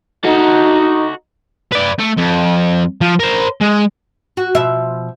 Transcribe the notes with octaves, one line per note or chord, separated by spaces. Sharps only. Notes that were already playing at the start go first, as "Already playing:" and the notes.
D#4 F#4 A4
B4 D5
A3
F2
F3
A#4 C5
G#3
F#4
B2 F3 E5